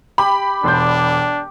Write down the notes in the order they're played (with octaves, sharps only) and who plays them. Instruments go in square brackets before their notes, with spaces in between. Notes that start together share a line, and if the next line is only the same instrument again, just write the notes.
[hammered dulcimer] G4 [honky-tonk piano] B5
[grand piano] E1 C6 G6 [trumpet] D4